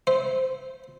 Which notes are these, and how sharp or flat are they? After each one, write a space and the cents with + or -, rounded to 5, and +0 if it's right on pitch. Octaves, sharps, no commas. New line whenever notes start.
C5 -10 E5 -25